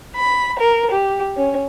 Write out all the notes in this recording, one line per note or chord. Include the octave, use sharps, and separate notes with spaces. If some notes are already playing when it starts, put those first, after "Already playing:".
B5
A#4
G4
C#4